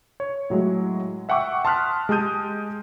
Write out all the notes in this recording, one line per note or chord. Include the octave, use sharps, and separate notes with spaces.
C#5
A2 F#3 G#3
E5 F#5 G5 C#6 D6 E6
A5 C6 D#6 F6 F#6 B6
G#3 G4 A5 D#6 G6 D#7